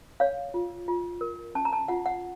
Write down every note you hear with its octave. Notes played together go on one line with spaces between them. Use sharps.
C#5 F5
F4
F4
A#4
C#4 A5
A#5
A5
F4 F#5
F#5